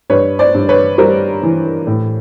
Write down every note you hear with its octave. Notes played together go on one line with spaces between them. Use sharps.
G2 B4 C#5
C5 D5
G2
B4 C#5
G3 A#4 C5
E3
A2